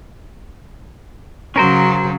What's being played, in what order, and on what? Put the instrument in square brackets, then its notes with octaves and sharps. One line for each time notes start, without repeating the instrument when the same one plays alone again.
[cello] C#3 F#3 [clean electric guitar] C#4 A#4 C5